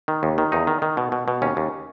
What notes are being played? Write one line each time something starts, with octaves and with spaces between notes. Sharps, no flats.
D#3
D#2
D#3
E2 D#4
D#3
D#3
B2
B2
B2
D#2 C#4
D#2